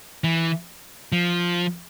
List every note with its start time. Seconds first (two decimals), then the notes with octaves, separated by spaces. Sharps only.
0.24 E3
1.12 F3